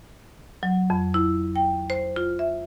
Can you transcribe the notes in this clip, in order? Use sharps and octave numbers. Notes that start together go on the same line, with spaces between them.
F#3
F2
E4
G5
C5
F4
E5